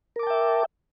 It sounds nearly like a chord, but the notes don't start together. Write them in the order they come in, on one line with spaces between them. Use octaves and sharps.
A#4 D6 A5 G5 E5